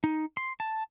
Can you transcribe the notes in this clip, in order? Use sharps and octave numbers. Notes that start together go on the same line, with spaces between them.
D#4
C6
A5